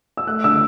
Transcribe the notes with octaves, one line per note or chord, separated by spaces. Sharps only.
E6
A3 F#6
D3 E6